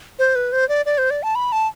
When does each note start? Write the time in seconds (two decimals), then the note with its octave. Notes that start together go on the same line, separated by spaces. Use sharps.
0.19 C5
0.35 B4
0.52 C5
0.69 D5
0.86 D5
0.98 C5
1.10 D5
1.23 A5
1.35 B5
1.52 A5